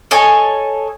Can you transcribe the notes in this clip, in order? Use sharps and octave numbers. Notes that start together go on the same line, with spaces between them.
A4 C#5 D#5 G#5